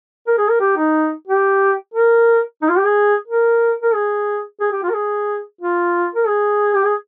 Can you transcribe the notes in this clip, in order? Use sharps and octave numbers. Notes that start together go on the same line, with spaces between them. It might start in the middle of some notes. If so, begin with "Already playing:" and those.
A#4
G#4
A#4
G4
D#4
G4
A#4
D#4
F4
G4
G#4
A#4
A#4
G#4
G#4
G4
F4
A#4
G#4
F4
A#4
G#4
G4
G#4